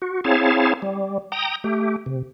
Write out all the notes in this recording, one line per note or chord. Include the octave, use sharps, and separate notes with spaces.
F#4
C4 E4 G#4 C#5 F5 A5
G3
G5 A#5 D#6
A3 G4
C3